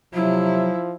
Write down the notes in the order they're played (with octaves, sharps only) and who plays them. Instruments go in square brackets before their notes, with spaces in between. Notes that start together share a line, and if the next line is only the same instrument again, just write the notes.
[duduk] C3 [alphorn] F3 [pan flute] F#3 [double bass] E4